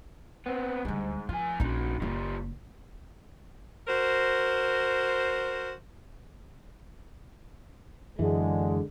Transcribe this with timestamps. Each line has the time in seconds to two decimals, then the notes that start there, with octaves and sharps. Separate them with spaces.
0.46 B3 C4
0.85 D2 G#2 G3
1.29 F3 F4 G#5
1.60 A#1 C#4 D#4 F#4
2.02 F#1 G3 A#3 F4
3.88 F#4 A#4 C5
8.19 F#2 D3 E3 G#3